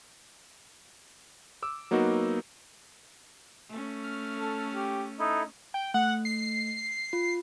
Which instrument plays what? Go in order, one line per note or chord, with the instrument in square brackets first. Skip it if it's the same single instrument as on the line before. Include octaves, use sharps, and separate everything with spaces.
[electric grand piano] D6 E6
F#3 A#3 B3 D#4 F#4
[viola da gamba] A3 C#4
[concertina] F6
[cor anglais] A4
G4
[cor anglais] D#4 [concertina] E4 A4
[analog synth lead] G5
[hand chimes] A3 [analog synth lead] F#5
[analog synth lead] C7
[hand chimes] F4